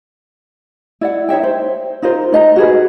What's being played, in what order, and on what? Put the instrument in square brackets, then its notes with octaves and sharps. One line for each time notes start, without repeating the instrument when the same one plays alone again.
[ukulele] E4 D5 F#5
D#4 C#5 E5 G5
C5
D#4 F4 A#4 C5
D#4 D#5 A#5
F#4 G#4 B4